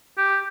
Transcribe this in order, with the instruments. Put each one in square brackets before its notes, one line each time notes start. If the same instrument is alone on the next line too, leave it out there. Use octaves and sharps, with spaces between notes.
[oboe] G4